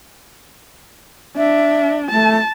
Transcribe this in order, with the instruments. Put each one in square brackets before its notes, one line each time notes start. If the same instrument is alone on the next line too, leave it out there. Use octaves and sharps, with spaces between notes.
[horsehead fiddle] D4 [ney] E5
[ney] A3 [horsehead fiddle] A5